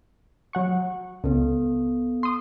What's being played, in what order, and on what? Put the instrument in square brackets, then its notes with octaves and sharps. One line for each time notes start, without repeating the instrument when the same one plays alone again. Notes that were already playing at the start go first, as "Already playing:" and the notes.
[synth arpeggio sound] F#3 F#5 C#6
[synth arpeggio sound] C#2 [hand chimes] B3 A4
[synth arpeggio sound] C6 D#6